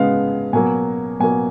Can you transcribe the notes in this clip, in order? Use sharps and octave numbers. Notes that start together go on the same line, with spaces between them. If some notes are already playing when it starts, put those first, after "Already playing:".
Already playing: C#3 G#3 B3 F5
B2 F#3 A#3 G#5
B2 F#3 A#3 G#5